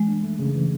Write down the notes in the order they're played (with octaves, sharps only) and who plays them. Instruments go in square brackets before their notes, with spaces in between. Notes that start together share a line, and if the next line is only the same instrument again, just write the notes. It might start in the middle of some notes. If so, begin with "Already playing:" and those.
Already playing: [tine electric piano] E3 [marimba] G#3
[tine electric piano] D4
A3
C#3
E3